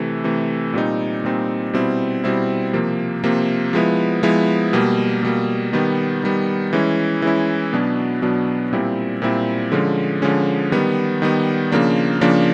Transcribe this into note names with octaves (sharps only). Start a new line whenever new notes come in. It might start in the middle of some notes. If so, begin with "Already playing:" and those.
Already playing: C3 E3 A3
C3 E3 A3
A#2 G3 C4 D#4
A#2 G3 C4 D#4
B2 G3 C4 E4
B2 G3 C4 E4
C3 F3 A#3
C3 F3 A#3
F3 G#3 B3 E4
F3 G#3 B3 E4
B2 G3 A#3
B2 G3 A#3
D#3 G3 B3
D#3 G3 B3
E3 G#3 C#4 E4
E3 G#3 C#4 E4
B2 F#3 B3 D4
B2 F#3 B3 D4
A#2 G3 C4 E4
A#2 G3 C4 E4
D3 F3 G#3 C#4
D3 F3 G#3 C#4
D#3 G3 B3
D#3 G3 B3
C#3 F3 A#3 D4
C#3 F3 A#3 D4